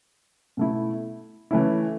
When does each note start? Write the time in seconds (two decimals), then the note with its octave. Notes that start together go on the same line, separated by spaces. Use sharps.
0.57 B2 A3 E4
1.51 E3 A3 C#4 E4